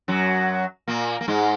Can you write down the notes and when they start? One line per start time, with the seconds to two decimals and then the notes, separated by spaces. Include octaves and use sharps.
0.08 F#2 F#3
0.88 A#2 A#3
1.21 A#3
1.28 G#2 G#3